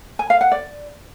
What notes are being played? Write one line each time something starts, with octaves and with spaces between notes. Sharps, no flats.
G#5
F5
F#5
D5